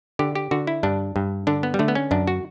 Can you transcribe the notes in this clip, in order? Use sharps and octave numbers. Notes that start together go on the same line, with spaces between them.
D3 G4
G4
D3 F#4
E4
G2 D4
G2
D3 D4
B3
G3
D3 A3
B3
C#4
F#2 D4
F#4